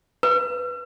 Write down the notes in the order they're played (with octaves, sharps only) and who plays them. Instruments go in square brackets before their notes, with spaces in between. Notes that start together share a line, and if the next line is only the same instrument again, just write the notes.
[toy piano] B4